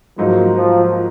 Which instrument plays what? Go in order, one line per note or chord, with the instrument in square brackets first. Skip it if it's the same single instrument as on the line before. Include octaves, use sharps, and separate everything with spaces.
[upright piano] G#2 F#3 A#3 D#4 [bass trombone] F3
[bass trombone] F3